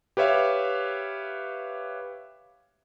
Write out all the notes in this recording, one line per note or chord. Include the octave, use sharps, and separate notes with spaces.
G4 B4 C#5 E5 F5